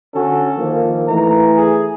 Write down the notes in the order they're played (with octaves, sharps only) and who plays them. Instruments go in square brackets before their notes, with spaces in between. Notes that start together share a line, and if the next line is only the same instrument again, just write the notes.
[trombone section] D3 C#4 F#4 [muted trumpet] A4
[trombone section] D#3 F3 A#3
[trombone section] E3 A3 [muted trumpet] A#5
[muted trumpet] G#4